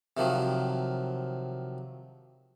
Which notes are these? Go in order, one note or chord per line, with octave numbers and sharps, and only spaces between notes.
C3 D#3 F3 F#3